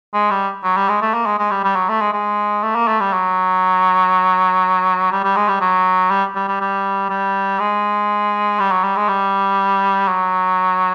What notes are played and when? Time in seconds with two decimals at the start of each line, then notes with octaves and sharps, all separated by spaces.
0.14 G#3
0.31 G3
0.64 F#3
0.77 G3
0.89 G#3
1.02 A3
1.14 A#3
1.26 G#3
1.39 G#3
1.51 G3
1.64 G3
1.76 F#3
1.89 A3
2.01 G#3
2.13 G#3
2.63 A3
2.75 A#3
2.88 A3
3.00 G3
3.13 F#3
5.12 G3
5.24 G3
5.36 G#3
5.49 G3
5.61 F#3
6.11 G3
6.35 G3
6.48 G3
6.61 G3
7.10 G3
7.59 G#3
8.60 G3
8.72 F#3
8.84 G3
8.97 G#3
9.09 G3
10.08 F#3